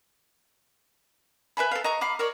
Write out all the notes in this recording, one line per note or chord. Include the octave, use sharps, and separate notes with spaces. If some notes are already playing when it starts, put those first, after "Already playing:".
B4 E5 G#5 B5
A4 F5
D#5 A#5 C#6
F5 B5 D6
A#4 C#5 D5